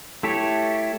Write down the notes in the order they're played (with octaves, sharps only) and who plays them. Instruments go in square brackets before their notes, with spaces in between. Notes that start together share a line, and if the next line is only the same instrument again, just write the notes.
[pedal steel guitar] A3 E4 G4 A4 C#5